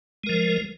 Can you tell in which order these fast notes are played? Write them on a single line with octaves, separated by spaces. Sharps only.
G#3 A#4 F3